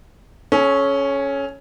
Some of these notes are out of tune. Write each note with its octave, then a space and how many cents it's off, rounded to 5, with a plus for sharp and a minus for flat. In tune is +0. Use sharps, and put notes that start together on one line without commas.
C#4 +0 A4 -40